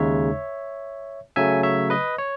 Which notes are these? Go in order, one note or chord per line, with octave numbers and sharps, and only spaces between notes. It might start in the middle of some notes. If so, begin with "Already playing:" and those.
Already playing: D#2 C#3 G#3 D#4 C#5 E5
C#3 F#3 A3 E5 G#5
C#5 E5
B4 D#5
C#5